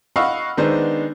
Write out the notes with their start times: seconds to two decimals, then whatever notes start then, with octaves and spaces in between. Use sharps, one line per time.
0.16 D#5 F5 F#5 B5 C#6 E6
0.57 D#3 G#3 B3 D4 D#4 C5